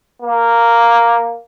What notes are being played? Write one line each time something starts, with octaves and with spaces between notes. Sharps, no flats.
A#3